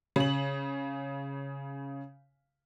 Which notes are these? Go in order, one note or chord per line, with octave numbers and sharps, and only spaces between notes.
C#3 F#7